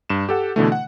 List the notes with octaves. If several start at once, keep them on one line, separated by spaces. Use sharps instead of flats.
G2 E7
G4 A4 F#5
B2 D3 E3 A3
F#5